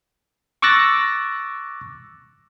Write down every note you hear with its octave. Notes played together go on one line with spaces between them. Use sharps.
C#6 D6 E6 F#6 A6 A#6